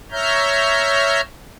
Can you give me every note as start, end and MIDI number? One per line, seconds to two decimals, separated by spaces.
0.12 1.21 73
0.12 1.21 76
0.12 1.21 82
0.12 1.21 89
0.12 1.21 91